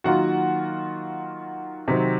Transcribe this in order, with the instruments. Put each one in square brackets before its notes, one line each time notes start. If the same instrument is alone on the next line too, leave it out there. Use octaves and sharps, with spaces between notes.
[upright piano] D#3 F#3 A#3 F4 F#4 F#5
C3 D#3 F#3 C4